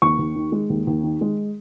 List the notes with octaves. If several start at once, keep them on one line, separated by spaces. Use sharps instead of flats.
D#2 C#6
D#2
D#3
G#3
D#2
D#2
D#3
G#3